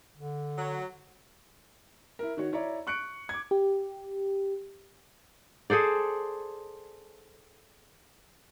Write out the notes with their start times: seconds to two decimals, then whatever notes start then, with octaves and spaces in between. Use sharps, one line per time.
0.16 D3
0.57 F#3
2.19 E4 A#4
2.37 D#3 F#4 C#5
2.52 E4 C#5 D5 A#5
2.87 C#6 F#6 C#7 D7
3.29 D6 G#6
3.51 G4
5.70 G#4 A4 C5 D5